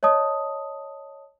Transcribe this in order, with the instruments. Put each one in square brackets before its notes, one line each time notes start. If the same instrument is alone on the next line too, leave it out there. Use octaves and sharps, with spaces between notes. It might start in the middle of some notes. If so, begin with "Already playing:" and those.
[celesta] C#5 D#5 A5 D#6